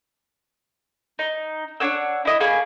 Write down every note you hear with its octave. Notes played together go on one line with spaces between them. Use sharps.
D#4
D4 C#5 F#5 E6
E4 D#5 E5
A#3 C#4 G#4 B5